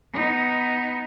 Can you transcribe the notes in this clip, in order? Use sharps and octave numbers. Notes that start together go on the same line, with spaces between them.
B3 D#4